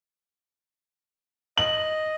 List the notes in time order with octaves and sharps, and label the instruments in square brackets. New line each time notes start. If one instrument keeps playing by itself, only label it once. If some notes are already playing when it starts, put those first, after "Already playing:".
[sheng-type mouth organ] D#5 [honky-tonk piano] F#7